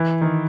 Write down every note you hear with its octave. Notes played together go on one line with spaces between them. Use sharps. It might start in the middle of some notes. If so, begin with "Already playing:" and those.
Already playing: E3
D#3